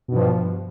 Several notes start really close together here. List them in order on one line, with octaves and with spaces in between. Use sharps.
B2 G2 F3